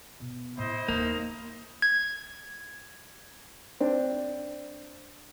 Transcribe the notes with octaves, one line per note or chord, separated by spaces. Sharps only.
B2
A2 E4 C5 D#5
D#2 A#3 D#4
G#6
C4 D4